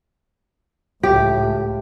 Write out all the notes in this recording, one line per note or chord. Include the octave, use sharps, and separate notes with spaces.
C#2 A2 G4